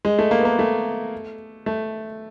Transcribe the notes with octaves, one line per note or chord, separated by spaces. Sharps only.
G#3
A3
A#3
B3
A#3
A3
A3